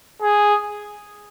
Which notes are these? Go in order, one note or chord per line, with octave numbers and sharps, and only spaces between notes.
G#4